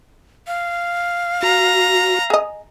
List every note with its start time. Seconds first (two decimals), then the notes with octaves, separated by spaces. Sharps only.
0.47 F5
1.43 F#4 A#5
2.30 G#4 D#5